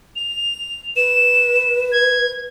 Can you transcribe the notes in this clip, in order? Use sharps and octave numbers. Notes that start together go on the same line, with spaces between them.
F7
B4 E7
G#6